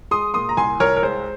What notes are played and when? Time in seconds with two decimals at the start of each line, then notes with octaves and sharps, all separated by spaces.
0.11 G#3 C6 D#6
0.34 A#2 C6 D#6
0.49 A#5
0.57 C2 G#5 C6
0.80 C2 A#4 C#5
0.96 A#4
1.02 G#3 C5